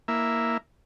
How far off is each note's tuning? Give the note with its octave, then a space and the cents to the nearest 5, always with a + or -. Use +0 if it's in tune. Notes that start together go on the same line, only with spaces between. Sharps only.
A#3 +0 E4 +0 E5 +0